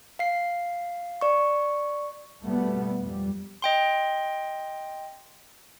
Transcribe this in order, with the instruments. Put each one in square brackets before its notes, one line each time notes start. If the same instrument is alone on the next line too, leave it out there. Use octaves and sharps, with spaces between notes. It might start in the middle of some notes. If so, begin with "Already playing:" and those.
[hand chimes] F5 C7
D5 C#6
[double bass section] B2 G3 A3 B3
F2 G3
[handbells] D#5 G5 C6